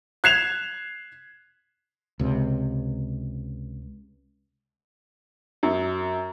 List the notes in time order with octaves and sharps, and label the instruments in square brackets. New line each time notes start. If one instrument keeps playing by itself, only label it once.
[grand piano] F#6 G#6 C7 E7 F7
[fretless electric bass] C#2 C3
[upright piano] F#2